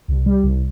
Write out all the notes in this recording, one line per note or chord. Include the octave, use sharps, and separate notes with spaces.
C2
G3
C2